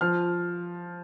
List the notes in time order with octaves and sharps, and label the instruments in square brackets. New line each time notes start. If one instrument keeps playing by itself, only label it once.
[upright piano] F3 F6